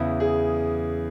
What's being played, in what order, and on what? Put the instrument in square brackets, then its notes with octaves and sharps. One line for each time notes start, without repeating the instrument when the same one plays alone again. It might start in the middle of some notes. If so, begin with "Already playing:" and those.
Already playing: [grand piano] E2 C#3 E3 E4
G#4